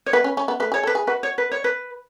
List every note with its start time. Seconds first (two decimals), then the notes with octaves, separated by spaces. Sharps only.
0.06 C#5
0.13 B3 B4
0.24 C#4
0.37 C#4
0.48 B3
0.60 A3 B4
0.72 G#4 C#5
0.83 A4
0.87 B4
0.95 G#4
1.07 F#4 B4
1.23 C#5
1.38 B4
1.52 C#5
1.64 B4